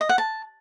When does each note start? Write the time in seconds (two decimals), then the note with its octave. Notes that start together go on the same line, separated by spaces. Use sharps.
0.01 D#5
0.09 F#5
0.18 A5